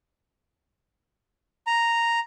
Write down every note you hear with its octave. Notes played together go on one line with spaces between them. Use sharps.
A#5